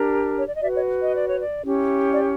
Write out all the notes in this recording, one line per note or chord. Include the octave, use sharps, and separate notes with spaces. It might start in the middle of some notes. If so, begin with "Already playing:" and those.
Already playing: D4 G4 A#4
C#5
D5
D#5
F#4 B4 D5 E5
C#5 D#5
D#5
D5
C#5
D5
C#4 E4 G4
D5